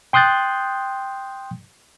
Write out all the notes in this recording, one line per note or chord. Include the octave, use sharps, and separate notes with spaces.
G5 C6 D#6 F#6 G6 A6